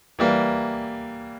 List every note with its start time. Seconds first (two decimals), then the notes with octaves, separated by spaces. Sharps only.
0.19 E3 G3 A#3